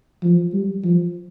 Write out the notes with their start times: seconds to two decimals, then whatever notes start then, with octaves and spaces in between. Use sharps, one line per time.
0.23 F3
0.53 G3
0.84 F3